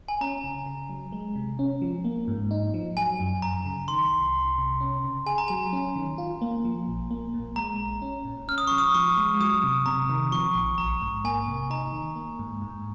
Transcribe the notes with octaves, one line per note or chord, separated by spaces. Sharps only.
G#5
C#4 A#5
C#3
C#3
F#3
G#3
C3
C#4
F3
A#3
G#2
D#4
F3
F#3 G#5
F#2
F#2 A#5
C#3
D#3 C6
C2
C2
C3
C#4
C#3
G#4 G#5
A#5
F#3 G#5
C#4
D#3
F4
A#3
F3
A#1
A#3
A#2
G#3 A#5
A#1
C#4
A#2
C#4 F6
D#6
F3 C#6
D#6
F3 C#6
G#3
F#3 D#6
C3
C3 A#5
D#3
F3 C#6
A#1
A#1 A#5
G#2
A#3 G#5
C3
D#4 A#5
D#3
A#3
G#2
G#2